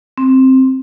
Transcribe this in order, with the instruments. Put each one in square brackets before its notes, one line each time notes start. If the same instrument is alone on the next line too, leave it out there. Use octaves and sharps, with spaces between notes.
[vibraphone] C4